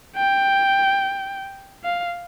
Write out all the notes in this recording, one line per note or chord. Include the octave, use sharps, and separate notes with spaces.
G5
F5